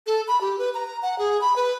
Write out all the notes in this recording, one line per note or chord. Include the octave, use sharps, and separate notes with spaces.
A4
B5
G4
B4
A#5
F#5
G#4
B5
B4